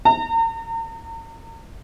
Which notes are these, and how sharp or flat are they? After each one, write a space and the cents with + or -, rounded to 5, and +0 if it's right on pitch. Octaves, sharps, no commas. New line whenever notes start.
A#5 -40